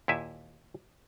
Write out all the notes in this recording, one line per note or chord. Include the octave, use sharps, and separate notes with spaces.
D#2 A#2 E4 E5 G#5